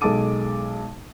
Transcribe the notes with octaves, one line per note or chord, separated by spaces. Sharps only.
B1 G#3 A4 A5 D6 D#7